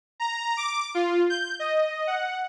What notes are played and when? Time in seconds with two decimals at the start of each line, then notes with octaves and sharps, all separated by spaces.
0.20 A#5
0.57 D6
0.95 F4
1.30 G6
1.59 D#5
2.07 F#5